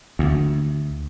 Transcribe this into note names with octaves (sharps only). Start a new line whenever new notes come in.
D2